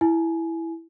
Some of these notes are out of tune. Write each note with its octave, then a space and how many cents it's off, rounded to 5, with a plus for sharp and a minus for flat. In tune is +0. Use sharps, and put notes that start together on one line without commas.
E4 +0 G#5 +25